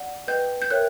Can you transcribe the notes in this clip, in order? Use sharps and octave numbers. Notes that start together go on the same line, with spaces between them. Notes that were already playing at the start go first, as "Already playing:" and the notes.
Already playing: D5 F#5
B4 D#5 G5 G6
G6
A#4 C#5 E5 G5 F#6